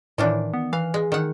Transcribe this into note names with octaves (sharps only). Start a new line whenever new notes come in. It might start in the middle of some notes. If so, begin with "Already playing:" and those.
A2 D#3 E3 D4
B3
E3 F5
G#3
D#3 F#5